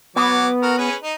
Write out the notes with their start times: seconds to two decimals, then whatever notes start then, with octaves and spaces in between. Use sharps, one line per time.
0.16 F#3 B3 D6
0.62 F#4 A#4
0.78 C#4 G#4 B4
1.03 D#4